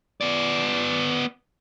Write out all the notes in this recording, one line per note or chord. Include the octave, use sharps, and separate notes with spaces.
B3 D5